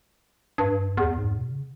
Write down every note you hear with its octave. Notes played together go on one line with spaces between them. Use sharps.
G2
E2
G#2
B2
C#3